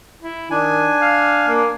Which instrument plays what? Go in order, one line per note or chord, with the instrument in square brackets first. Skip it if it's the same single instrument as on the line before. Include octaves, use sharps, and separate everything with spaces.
[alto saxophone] E4
[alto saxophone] D#3 [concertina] D4 G#5
[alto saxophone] F5
A#3